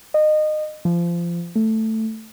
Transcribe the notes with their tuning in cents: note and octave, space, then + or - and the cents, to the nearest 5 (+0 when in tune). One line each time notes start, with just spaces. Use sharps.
D#5 -25
F3 -25
A3 +5